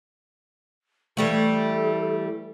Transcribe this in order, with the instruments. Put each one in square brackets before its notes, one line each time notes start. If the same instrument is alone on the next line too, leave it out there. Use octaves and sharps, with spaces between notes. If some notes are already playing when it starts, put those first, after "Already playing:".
[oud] E3 G3 A3 [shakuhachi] A4